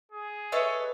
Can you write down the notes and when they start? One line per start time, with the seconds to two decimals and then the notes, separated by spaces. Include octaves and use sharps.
0.12 G#4
0.52 A4 B4 C#5 D#5 E5 E6